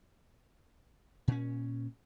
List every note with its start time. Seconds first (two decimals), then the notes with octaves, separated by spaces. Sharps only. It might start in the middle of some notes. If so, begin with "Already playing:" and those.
1.28 A#2 C#4